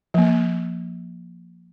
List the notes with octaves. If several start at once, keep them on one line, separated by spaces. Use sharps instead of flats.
F3 A#3